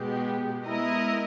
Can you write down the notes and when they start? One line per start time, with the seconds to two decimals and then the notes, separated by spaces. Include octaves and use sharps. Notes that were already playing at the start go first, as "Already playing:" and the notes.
Already playing: B2 G#3 B3 G4
0.67 G#3 B3 E4 A#4 D#5